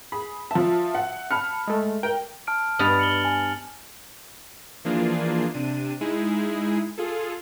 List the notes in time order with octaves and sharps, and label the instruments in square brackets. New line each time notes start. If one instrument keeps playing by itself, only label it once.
[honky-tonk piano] G#4 [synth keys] B5
[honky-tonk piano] F3 A5 [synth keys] E5
[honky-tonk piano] F#5
[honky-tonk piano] A5 B5 F6 [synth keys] C#7
[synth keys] G#3 A3
[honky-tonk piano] A#4 [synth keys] G5
[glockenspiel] A5 F6 D7
[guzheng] G2 B3 D#5 [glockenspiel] F6 A6 F7
[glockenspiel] C#7 F#7 G7
G#5
[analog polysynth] E3 F3 A#3 D4 F4 G#4
C3 D4 D#7
G#3 D#4 E4 G#4
F4 G#4 A4